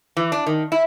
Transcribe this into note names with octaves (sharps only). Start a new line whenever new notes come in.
E3
D4
D#3
E4